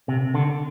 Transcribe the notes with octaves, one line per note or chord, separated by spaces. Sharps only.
C3
D3